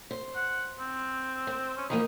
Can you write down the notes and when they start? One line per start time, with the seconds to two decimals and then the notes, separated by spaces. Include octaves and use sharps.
0.11 C5
0.36 F#5
0.80 C4
1.47 C5
1.78 C#4
1.90 E3 F3 A#3 D#4